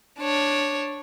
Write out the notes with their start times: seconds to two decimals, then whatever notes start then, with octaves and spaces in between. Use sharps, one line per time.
0.20 D4 C#5